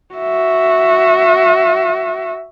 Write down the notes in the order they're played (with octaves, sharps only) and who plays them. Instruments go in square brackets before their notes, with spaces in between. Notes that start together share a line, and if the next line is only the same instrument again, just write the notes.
[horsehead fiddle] F#4 E5